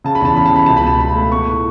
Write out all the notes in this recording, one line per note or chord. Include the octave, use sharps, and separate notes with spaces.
C#3 A5
B5
E2 A5
C#3 B5
A5
C#3 B5
C#2 A5
B5
B2 A5
B2 B5
A3
B3 C#6
A2